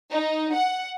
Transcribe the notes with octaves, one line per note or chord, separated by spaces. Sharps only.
D#4
F#5